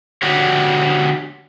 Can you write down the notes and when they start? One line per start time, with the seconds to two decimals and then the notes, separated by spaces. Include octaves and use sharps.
0.22 D3 D4 F#4 G4 C#5